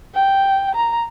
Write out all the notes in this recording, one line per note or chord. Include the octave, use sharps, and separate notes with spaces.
G5
A#5